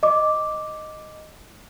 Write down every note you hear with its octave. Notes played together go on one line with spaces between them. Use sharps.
D#5 D6